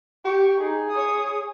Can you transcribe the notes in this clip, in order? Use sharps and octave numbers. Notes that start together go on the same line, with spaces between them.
G4 C#6
D#4 G#4
C#5 D#6